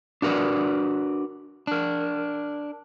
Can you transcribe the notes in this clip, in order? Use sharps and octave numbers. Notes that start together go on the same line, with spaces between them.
D4 F#4 A#4 B4 D5
D4 A#4